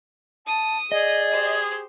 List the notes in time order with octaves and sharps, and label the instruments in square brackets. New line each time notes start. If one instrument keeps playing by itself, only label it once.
[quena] A5 [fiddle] D#6
[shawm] G#4 [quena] D5 [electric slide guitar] D#5
[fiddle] G4 C5